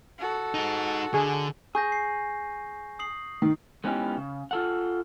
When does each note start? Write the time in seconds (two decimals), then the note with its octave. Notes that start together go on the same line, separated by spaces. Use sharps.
0.19 F#4 A4
0.54 D#4 G#4
1.14 D3 G#4
1.75 G#4 C#6 G6 A#6
1.92 C7
2.99 D#6 C7 F#7
3.42 D#3
3.84 G#3 B3 C#4 D#4 E4 G4
4.17 C#3
4.51 F4 A4 F#5